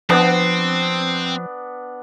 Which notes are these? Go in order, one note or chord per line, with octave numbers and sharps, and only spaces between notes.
F3 B3 C4 D4